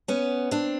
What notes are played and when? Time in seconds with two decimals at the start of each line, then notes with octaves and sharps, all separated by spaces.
0.08 B3 C#4
0.51 C4 D4